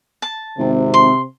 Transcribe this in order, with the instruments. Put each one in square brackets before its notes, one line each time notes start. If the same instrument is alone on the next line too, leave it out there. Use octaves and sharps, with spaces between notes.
[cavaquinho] A5
[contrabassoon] G#1 [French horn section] C3
[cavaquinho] C6